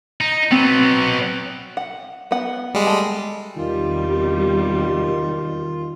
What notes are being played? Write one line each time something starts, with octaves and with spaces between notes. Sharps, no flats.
D#4
F#3 B3 C4
F#5
B3 F#5
G3 G#3
A3 A5
E2 C3 D#3 G3 F4